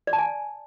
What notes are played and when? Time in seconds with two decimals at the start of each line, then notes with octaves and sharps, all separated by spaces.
0.07 D5
0.13 A5
0.18 G#5